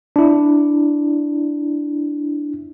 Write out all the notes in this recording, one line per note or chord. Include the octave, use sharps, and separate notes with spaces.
D4 E4